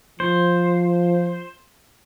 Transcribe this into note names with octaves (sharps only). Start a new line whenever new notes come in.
F3 C5